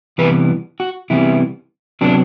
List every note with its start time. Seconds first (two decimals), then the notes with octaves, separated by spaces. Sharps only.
0.18 C3 E3 G3 B3 B4
0.80 F#4
1.10 C3 E3 G3 B3 E4
2.01 C3 F#3 B3 D4